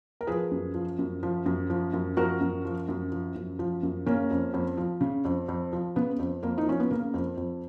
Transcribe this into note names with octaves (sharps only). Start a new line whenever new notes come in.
A#4
F3 G#4 B4
F#2
F3
F#2
F3
F#2
F3
F#2
F3 F#4 A#4
F#2
F3
F#2
F3
F#2
F3
F#2
C#3 A#3 C#4
F2
F2
F3
C#3
F2
F2
F3
C#3 B3
F2
F2 A#3
D#4
F3 C#4
B3
C#3 A#3
F2
F2